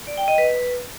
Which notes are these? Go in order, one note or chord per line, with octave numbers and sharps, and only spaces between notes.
D5
G5
D#5
B4